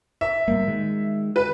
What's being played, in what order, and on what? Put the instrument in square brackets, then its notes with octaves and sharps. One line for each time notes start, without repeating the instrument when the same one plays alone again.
[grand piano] E5
[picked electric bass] A2 G3 A#3
D#3 G#3
[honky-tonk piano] B4